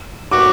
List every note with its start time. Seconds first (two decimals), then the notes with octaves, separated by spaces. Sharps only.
0.31 F#4 D6